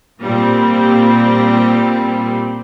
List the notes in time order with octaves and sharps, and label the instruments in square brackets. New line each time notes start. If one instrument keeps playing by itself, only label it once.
[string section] A#2 G3 C4